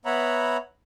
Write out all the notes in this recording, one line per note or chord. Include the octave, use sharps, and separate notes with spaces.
B3 C#5 E5 F#5 A#5 B5